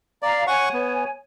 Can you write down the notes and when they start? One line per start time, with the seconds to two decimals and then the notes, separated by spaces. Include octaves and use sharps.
0.23 D5 F5 A#5
0.47 C#5 F#5 G#5 C#6
0.73 B3